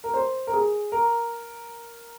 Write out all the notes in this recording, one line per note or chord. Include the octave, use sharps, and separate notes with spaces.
A#4
C5
A#4
G#4
A#4